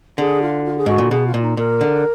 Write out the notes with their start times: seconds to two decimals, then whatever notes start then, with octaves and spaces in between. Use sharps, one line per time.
0.18 D3 G#4
0.42 F4
0.65 F4
0.77 G#4
0.86 G#2 F#4
0.98 A#2
1.11 B2 G#4
1.26 F4
1.34 A#2
1.41 D#4
1.57 A#2 A#4
1.81 D3